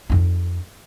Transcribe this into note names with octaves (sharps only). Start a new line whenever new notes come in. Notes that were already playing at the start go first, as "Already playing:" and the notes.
F2 D#4